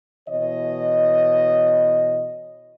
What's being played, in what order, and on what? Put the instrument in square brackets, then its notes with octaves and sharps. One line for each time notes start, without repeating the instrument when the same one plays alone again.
[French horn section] B2 E3 C#5 D#5